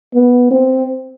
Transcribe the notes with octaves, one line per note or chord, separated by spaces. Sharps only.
B3
C4